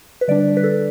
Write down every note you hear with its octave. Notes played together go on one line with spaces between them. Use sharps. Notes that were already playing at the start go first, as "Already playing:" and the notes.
B4
D3 G3 D4 D5
B4
A4